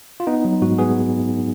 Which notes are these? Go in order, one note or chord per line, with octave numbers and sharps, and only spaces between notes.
F4
B3 D#4
F#3
G#2 F#4
B3 G#4